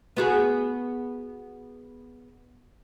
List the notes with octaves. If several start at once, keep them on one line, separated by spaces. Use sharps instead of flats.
B3 F#4 G#4